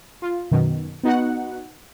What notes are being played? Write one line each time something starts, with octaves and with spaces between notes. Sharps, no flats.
F4
F#2 B2 D#3
B3 D#4 F#4 F#5